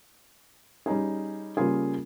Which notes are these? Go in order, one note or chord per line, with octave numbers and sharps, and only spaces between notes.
G3 C#4 D#4 G#4
C#3 G3 A#3 F4 G#4